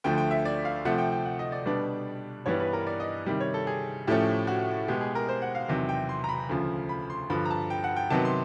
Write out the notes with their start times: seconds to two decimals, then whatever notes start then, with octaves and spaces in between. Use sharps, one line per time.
0.04 D2 D3 F3 A3 G5
0.18 G5
0.31 E5
0.45 D5
0.65 F5
0.85 C3 F3 A3 F#5
0.98 G5
1.12 G5
1.25 F#5
1.39 D#5
1.52 D5
1.66 B2 G3 B3 D4
2.46 G2 E3 G3 B3 D4 C#5
2.60 B4
2.73 A#4
2.87 D5
3.00 D#5
3.26 C3 D#3 G3
3.40 C#5
3.54 A4
3.67 G#4
4.07 A2 F3 A3 C#4 G4
4.47 F#4
4.88 B2 G#3 B3 G4
5.01 G#4
5.15 A#4
5.28 C5
5.42 F#5
5.55 F5
5.69 E2 C3 D#3 F#3
5.89 G5
6.09 C6
6.24 A#5
6.29 B5
6.49 D2 C#3 F3
6.89 B5
7.10 C6
7.30 G2 D3 F3 B5
7.45 A#5
7.50 A5
7.70 G5
7.84 F#5
7.96 G5
8.10 C3 D#3 F#3 B3 A5
8.25 C6